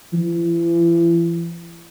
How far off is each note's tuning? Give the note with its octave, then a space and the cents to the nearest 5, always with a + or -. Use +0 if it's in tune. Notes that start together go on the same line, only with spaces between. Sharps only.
E3 +40